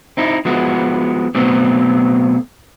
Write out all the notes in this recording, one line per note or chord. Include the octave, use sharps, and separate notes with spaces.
C4 D#4 E4
F3 G#3 B3 E4 F#4
B2 F#3 A3 B3 C4